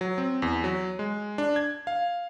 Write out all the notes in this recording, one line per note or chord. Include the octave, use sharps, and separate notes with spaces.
F#3
C4
E2
F#3
G#3
D4
G#6
F5